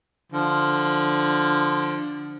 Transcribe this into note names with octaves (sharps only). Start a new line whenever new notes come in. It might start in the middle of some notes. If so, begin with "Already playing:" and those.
D3 F3